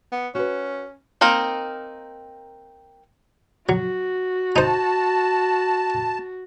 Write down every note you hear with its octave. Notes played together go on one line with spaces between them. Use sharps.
B3
C#4 F#4 B4
A#3 C4 D#4 A#4
F#3 F#4
D#4 C5 A5